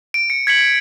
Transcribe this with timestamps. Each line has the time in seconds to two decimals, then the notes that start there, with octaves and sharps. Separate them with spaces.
0.14 D7
0.30 C#7
0.47 G#6 B6 C#7 F#7